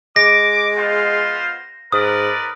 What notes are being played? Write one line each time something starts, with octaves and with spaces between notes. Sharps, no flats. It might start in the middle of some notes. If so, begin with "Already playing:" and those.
G#3 D6 A#6
B3 F4 C5
G#2 A#4 B4 D5 D#6